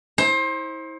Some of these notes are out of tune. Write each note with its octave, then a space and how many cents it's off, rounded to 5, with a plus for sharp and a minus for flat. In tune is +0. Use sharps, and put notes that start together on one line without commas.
E4 -35 C5 +25